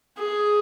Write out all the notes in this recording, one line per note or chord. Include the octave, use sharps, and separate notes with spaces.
G#4